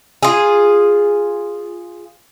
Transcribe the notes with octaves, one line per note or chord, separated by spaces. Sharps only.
F4 G#4